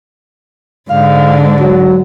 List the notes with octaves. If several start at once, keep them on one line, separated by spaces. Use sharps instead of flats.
G#2 D3 F5
F#3